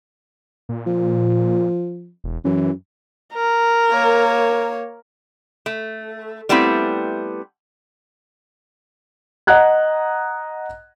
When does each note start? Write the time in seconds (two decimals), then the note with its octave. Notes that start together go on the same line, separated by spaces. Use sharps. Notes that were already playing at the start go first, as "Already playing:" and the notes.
0.69 A#2
0.86 F3
2.24 E1
2.45 F#2 E3
3.34 A#4
3.91 A#3 C#5
5.66 A3
6.49 G3 A3 B3 C4 E4
9.47 D#5 F#5 A#5 F#6 G#6